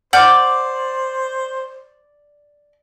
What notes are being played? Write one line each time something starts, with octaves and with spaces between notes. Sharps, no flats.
C5 D5 F#5 F6 G6